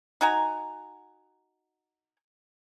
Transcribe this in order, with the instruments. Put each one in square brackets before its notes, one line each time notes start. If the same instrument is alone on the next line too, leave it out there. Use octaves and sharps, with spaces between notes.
[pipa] D#4 F#4 G#5 A#5